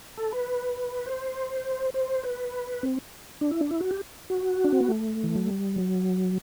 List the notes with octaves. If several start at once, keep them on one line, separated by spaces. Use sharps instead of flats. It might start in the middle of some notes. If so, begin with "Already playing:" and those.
A4
B4
C5
C5
B4
C4
D4
E4
D4
E4
F#4
G4
F#4
D4
C4
B3
A3
E3
F#3
G3
F#3